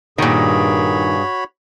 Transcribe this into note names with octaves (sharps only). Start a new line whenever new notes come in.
G2 A#2 D#3 F#4 G#4 C#5 B5